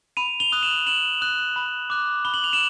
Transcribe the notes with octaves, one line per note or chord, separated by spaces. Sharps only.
B5 D#7 F7
F7 G7
D#6 F#6
E7 F#7
B5 E7 F#7
D#6 F#6
B5
D6 F#6
B5 G7
F#7
F7
E7 F#7